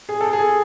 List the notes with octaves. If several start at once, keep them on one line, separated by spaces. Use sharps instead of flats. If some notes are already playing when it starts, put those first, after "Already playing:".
G#4
A4
G#4